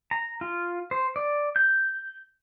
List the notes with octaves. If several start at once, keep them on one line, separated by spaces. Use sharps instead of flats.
A#5
F4
C5
D5
G6